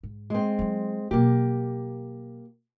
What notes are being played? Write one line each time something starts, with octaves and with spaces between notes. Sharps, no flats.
G#2
G#3 C4
F#3 E4
B2 F#3 A#3 G4